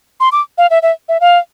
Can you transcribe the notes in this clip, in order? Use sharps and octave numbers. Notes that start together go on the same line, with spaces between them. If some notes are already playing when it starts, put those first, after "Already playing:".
C6
D6
F5
E5
E5
E5
F5